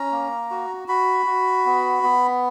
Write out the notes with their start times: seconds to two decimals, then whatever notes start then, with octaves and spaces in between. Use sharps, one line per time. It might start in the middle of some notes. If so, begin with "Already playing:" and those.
Already playing: C#4 A#5
0.11 A#3
0.51 F#4
0.88 F#4 B5
1.26 F#4
1.66 B3
2.03 B3